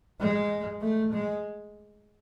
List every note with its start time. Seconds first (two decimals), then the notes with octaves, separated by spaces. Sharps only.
0.20 G#3
0.81 A3
1.12 G#3